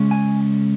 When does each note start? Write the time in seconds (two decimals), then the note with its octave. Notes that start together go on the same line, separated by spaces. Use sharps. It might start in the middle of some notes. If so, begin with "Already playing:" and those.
Already playing: C#3 G#3 C#4
0.11 G#5